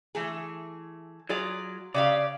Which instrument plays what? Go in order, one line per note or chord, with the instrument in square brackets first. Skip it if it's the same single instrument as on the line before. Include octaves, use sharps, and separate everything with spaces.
[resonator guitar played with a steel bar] E3 A3 G#4
[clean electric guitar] F#3 [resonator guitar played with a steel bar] F4 G#4 D5
[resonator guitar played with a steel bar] C#3 G4 F5 [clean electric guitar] D5